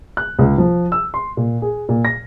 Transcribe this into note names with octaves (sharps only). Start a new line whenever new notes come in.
F#6
C#2
F3
E6
C6
A#2
G#4
A#2
A#6